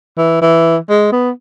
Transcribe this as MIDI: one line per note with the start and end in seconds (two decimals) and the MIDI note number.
0.17 0.38 52
0.41 0.77 52
0.89 1.09 56
1.12 1.31 59